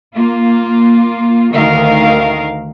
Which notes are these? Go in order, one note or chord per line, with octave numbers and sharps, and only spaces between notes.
A#3 F4
D2 D#3 A#4 F5